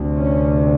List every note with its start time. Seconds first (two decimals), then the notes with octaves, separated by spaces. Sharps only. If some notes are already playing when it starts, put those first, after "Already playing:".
Already playing: D2 C3
0.17 C#4